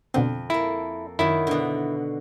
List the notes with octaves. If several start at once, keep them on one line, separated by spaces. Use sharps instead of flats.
F2 B2 D3 C4
A#3 E4 A4
F#2 D#3 F#3 E4
B2 D3